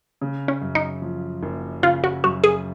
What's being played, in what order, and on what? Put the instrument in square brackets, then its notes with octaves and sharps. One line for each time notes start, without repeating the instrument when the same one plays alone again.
[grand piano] C#3
[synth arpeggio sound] C#4
[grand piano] F#2
[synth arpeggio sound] D#4
[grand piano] F3
F#1
[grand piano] C#3 [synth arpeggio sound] F4
[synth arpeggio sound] F#4
[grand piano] F#2 [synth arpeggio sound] F#4
[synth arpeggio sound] G#4